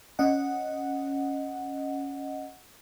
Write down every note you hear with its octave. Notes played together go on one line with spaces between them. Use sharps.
C#4 D#5 F#5